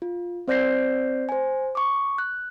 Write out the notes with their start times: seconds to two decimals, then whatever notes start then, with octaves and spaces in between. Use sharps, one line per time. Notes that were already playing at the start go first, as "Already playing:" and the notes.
0.02 F4
0.48 C4 C5 D5 G6 A#6 C7
1.29 C5 G#5
1.75 C#6 D6
2.18 F#6